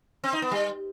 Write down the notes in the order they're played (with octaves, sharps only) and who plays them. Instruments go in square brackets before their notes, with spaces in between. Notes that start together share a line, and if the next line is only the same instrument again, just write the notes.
[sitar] C4
D#4
B3
G3